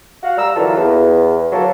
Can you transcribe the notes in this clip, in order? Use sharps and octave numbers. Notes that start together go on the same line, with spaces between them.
F#4 F5 F#5
G3 A#5 E6
D3 E3 F#3 A#3 F4 A4
E2
D2 F#3 A#3 A4